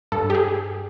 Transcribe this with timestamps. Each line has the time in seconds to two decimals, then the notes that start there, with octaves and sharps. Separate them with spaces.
0.12 G2 A4
0.30 G4
0.35 G#4